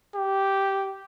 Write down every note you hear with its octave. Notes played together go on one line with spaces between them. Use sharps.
G4